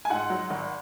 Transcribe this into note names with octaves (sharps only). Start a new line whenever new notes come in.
G#5
G#2 F#5
F#3
G#1